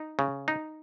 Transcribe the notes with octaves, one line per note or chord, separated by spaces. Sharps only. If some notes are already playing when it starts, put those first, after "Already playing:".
Already playing: D#4
C#3
D#4